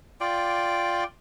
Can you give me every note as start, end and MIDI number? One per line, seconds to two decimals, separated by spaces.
0.20 1.04 65
0.20 1.04 74
0.20 1.04 79